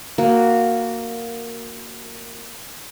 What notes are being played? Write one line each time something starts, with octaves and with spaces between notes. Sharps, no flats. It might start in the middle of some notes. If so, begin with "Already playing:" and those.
A#3 F#4